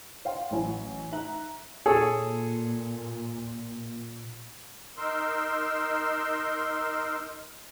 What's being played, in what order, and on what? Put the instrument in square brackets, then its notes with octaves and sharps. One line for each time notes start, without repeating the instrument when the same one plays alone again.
[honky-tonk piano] C#5 F5 G5 C6
A1 E3 F#3 E4 C#5 G#5
D#4 E5 A#5 F#6 F#7
[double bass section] A#2 [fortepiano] G#4 A4 C#5
[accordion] D#4 A#4 C6 E6